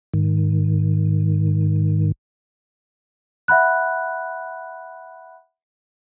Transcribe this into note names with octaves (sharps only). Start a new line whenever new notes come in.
G#2 D#3
E5 F#5 B5 F#6